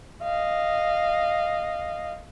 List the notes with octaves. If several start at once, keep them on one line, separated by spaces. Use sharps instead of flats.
D#5 F5